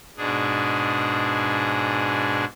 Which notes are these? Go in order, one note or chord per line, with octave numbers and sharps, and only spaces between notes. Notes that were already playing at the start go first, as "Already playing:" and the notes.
G#2 B2 D4 G#4